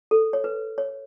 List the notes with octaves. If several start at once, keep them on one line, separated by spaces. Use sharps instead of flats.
A4
C#5
B4
C#5